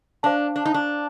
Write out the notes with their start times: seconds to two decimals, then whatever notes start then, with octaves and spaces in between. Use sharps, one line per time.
0.23 D4 C5 F5 A5
0.56 D4
0.66 D#4
0.74 D4